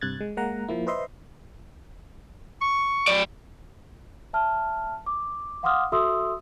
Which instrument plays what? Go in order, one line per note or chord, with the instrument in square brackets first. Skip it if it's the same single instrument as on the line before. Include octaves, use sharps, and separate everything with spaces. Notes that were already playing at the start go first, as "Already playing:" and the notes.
[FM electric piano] G2 C3 F#6 G#6 A6
G#3
G#3 A#3 F#5 A#5
F3 A#3 E4
B4 C5 D#5 E5 C6
[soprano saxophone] C#6
[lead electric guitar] F#3 D5
[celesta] E5 A5 F6
D6
F5 F#5 C6 D6 D#6 F6
F#4 A4 E5 C6 D#6 E6